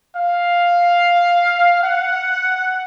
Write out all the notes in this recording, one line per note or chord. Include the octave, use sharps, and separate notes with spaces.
F5
F#5